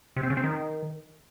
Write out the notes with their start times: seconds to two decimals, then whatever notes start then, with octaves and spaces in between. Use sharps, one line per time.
0.16 C3
0.23 C4
0.30 C#3
0.37 C4
0.44 D#3